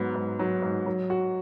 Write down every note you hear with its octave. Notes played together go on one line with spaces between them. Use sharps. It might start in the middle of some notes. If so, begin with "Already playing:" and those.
Already playing: G#2 F#3 B3
G#2
F#3
G#2
F#3
F#4